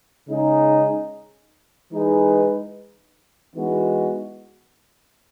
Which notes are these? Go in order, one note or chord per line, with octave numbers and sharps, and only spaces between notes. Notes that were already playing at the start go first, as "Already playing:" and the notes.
C#3 G#3 D#4 G#4
E3 G#3 D#4 G#4 B4
E3 G#3 B3 D#4 F#4